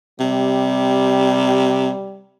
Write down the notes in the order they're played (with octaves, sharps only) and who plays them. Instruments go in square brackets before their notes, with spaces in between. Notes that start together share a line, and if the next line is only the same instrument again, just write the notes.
[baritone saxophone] C3 [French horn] G3